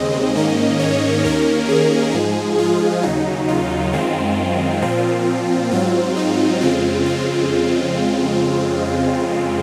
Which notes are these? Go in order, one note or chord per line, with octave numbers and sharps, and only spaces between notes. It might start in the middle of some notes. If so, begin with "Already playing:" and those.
Already playing: D#2 C#3 G#3 C4 D#5
G#2 D#3 A#3 C#4
C#5
D#2 D#3 A#3 C#4 A#4
G#4
G#2 F3 G#3
F4
D#2 C#3 F#3 D#4
F4
F#2 D#3 G#3 C4
A#2 F3 C4 F4
G#2 F#3 C4 F4
D#4
F2 C#3 G#3 C4 F4
F4